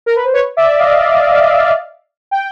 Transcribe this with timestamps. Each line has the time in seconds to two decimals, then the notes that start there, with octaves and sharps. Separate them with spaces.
0.06 A#4
0.16 B4
0.24 C5
0.33 B4 C#5
0.57 D5 E5
0.79 D#5 F5
2.31 G5